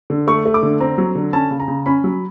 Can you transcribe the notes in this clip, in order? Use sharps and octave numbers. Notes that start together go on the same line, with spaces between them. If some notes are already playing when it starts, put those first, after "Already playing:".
D3
A3 C#6
A3
D6
D3
C4 A#5
F#3
D3
C#4 A5
C#3
A#5
C#3
C#4 B5
F#3